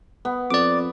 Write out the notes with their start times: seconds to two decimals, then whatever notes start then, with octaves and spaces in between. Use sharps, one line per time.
0.25 B3
0.50 F2 D5 D6